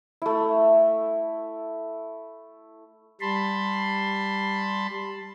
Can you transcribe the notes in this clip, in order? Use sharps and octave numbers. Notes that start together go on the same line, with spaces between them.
A3 E4
G3 A5 B5 C6